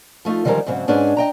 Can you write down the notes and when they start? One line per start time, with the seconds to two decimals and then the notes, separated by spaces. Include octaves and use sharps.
0.25 F3 A3 D#4 F4
0.45 D3 D#3 F3 G3 G#3 A#4
0.66 G#2 C#3 F#3 C4
0.88 G#2 C#4 D4 G#4 B4 G#5
1.17 D#5 G5 A#5